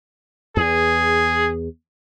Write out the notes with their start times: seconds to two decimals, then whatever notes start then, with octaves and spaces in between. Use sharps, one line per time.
0.57 E2 G#4